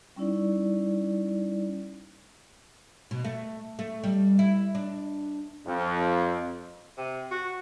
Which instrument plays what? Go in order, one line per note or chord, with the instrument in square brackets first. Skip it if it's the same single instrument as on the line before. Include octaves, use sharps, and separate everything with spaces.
[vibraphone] G3 C#4 D#4 E4 D5
[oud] B2
A3
A3
G3
E4
D4
[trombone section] F2
[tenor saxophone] C3
F#4